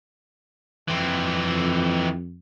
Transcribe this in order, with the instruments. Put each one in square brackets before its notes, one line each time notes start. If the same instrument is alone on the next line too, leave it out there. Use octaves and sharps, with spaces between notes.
[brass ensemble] F2 [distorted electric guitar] E3 C4